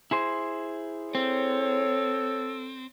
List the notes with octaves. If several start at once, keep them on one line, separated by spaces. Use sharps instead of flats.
E4 G#4 C5
C4 A4 C#5